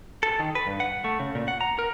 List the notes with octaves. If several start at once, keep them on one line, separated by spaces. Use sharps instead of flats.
A4
D#3
B4
G2
F#5
A3
C#3
A#2
F#5
A#5
A#4